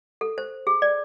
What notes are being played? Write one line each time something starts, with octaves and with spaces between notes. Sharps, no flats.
A4
C5
G#4
D5